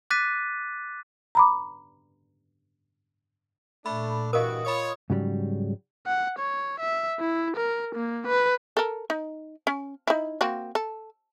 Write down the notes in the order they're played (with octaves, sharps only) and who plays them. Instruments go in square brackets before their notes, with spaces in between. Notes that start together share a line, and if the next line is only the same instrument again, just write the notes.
[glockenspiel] D6 F#6 A6 B6 D#7
[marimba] A#5 B5 D6
[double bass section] A#2 [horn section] A3 D4 [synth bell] B5
[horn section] G2 E3 F#4 [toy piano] A#4 F5 [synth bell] D#5 D#6
[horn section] F4 C#5 [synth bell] B5 D#6
[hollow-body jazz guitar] G#2 C#3 F#3 G3
[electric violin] F#5
C#5
E5
E4
A#4
A#3
B4
[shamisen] A4 A#4
D#4
C#4
D#4 E4
A#3 C4 F#4
A4